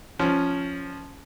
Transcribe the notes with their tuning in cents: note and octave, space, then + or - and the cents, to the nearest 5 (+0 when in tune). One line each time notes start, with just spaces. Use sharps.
F3 +0 C#4 +0